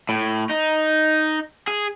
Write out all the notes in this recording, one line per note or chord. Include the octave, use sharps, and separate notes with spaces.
A2
D#4
G#4